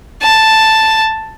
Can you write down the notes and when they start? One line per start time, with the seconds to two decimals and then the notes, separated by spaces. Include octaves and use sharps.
0.22 A5